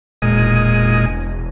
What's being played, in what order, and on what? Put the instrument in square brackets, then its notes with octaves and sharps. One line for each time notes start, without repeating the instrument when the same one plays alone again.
[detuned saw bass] E1 [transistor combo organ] A#2 G#3 D#5